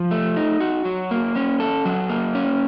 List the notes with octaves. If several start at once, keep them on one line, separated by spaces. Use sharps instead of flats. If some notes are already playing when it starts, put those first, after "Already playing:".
Already playing: F3
A3
D#4
F#4
F#3
A#3
C#4
A4
F#3
A#3
C#4